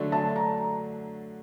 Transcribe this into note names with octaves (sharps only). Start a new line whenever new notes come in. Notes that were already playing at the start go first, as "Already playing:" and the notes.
Already playing: D3 F#3 A3 D4
A5
A#5